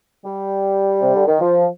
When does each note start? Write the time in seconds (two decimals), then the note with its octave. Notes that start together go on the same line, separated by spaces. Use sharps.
0.25 G3
1.01 C3
1.15 D3
1.27 D#3
1.40 F3